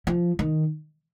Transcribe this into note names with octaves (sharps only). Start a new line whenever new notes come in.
F3
D#3